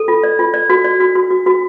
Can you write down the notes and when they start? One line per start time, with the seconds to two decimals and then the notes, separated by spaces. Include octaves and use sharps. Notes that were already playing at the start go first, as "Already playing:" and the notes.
Already playing: A4
0.08 F4
0.23 D5
0.39 F4
0.54 D5
0.70 F#4
0.84 D5
1.00 F#4
1.15 F#4
1.31 F#4
1.46 F#4